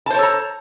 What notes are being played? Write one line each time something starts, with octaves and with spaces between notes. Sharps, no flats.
A4 C5 C#5 A5 A#5